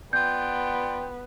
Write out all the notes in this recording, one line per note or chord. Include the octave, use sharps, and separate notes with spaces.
B3 F4 D5 G5 G6